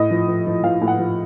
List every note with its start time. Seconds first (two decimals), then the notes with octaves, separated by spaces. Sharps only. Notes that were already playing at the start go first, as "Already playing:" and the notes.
Already playing: A2 D#5
0.11 F3
0.28 F3
0.47 F3
0.63 F3 F5
0.81 A2
0.87 F#5
0.99 F3